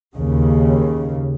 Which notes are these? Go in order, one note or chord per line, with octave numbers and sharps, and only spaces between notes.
D#2 C#3